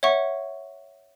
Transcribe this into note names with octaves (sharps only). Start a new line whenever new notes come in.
C#5 E5 F#5 C#6